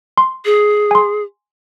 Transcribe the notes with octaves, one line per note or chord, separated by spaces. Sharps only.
C6
G#4
G#5 C6